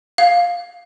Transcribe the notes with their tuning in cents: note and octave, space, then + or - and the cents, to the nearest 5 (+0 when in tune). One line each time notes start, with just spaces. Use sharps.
F5 +10